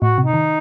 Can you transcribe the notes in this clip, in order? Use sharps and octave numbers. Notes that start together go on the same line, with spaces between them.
A2 F#4
C3
D#4
D#3